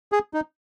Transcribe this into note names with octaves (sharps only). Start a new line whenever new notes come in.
G#4
D#4